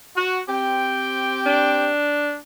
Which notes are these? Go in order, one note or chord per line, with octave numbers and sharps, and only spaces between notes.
F#4
C4 G4 G5
D4